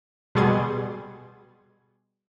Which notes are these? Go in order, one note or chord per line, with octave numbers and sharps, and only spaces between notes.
B2 G3 G#4 C6 G#6